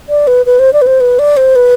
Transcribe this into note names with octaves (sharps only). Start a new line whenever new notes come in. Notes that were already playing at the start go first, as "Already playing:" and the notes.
D5
B4
B4
C5
D5
B4
C5
B4
D5
C5
B4